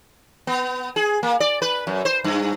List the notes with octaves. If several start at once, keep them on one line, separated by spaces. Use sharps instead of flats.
B3
G#4
A#3
D5
B4
F#2
C5
G2